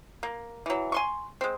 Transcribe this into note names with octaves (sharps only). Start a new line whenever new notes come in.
A#3
E3 F#3
G#5 C6 C#6
G#3 C4